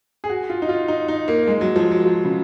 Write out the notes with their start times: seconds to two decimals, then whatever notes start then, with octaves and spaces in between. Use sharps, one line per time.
0.24 G#4
0.30 F#4
0.50 F4
0.62 D#4
0.69 F4
0.88 D#4
1.08 D#4
1.28 A#3
1.47 G#3
1.61 F#3
1.76 F3
1.91 F#3
2.06 F3
2.25 C#3